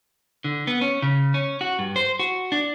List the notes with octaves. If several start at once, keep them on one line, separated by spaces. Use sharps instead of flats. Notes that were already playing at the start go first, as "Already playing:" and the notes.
D3
B3
C#4
C#3
C#4
F#4
G2
C5
F#4
D4